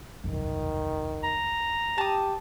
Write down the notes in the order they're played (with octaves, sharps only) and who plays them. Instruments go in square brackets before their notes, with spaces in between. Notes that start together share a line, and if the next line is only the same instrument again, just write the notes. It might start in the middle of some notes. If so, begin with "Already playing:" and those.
[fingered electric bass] E1 C2 F#2 [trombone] D#3
[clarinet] A#5
[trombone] G4 [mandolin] A5 D#6